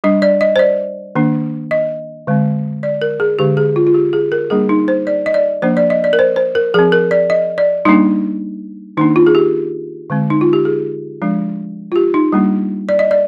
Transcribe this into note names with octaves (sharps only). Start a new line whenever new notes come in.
G3 D4 D#5
D5
D#5
C5
D5
D#3 A#3 D4
D#5
D3 G#3 C4
D5
A#4
G#4
D3 G#3 D4 G4
G#4
F4
F4
G4
G#4
A#4
G3 A#3 D4 G#4
D#4
C5
D5
D#5
D5
F3 A#3 D4 C5
D5
D#5
D5
A#4
C5
C5
A#4
F3 C4 G#4
A#4
D5
D#5
D5
G3 A#3 D4 D#4
D#3 A#3 D4 D#4
F4
G#4
G4
D3 G#3 C4
D#4
F4
G4
G#4
F3 G#3 D4
F4
G4
D#4
G3 A#3 D4
D5
D#5
D5